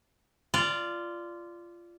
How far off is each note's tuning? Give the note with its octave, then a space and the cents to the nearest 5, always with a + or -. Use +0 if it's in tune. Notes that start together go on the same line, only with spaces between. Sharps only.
F4 -15 D5 +0